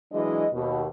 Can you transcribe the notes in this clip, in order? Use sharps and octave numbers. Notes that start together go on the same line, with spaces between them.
E3 F#3 G#3 D4 D#5
D#2 B2